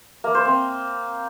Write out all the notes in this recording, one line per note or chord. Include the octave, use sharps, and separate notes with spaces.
A#3
C5
C4